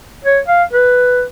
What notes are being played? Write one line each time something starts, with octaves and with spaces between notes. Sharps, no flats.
C#5
F5
B4